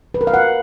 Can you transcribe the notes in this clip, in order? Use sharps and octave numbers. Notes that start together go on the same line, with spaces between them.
B4
A#4
F5
F#5